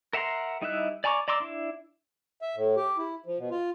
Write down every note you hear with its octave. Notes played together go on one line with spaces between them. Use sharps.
A#4 E5 F#5 A#5 C6
G3 D#4 E4 E5 F#6
D5 G#5 A#5 C#6 D6
D5 A#5 C6 D6 E6
D4 E4
E5
A2
G4
E4
F3
B2
F4